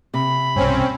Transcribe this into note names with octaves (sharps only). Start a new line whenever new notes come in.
C3 B5
B1 G2 C4 C#4